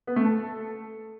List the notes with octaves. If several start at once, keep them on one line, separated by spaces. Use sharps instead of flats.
B3
A3
A4